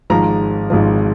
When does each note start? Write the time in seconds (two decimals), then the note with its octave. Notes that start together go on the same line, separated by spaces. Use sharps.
0.10 G#1 G#2 F3 A#5
0.70 G#1 G#2 F3